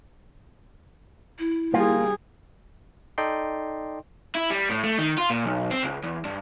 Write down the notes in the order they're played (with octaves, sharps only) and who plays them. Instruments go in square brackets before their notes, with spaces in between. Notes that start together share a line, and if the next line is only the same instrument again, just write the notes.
[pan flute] E4
[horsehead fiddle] G3 G#4 [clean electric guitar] A#3 F4
[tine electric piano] D#4 A4 D5 D#5 G5 C6
[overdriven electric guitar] E4
G3
A2
A3
D#3
F4
A#2
B1
C4
C#2
E2
G2